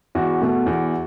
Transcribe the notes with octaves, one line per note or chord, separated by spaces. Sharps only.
E2 F#4
B2 A3
E2